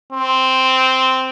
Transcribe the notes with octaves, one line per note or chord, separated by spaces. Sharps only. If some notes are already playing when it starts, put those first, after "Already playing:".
C4